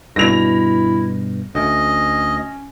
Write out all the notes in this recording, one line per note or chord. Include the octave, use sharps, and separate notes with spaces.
G2 B2 E4 A#6 F7
D2 C#4 D#5